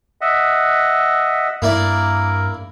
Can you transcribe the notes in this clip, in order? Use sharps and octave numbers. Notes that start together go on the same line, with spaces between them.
D#5 E5 F#5
G2 A#3 E4 A#4 D5